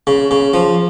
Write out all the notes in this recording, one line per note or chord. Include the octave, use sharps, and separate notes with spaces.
C#3
C#3
F3